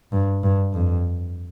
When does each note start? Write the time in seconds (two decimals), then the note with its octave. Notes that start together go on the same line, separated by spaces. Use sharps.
0.12 G2
0.43 G2
0.73 F2